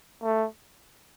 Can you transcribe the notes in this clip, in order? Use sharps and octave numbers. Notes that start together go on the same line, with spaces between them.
A3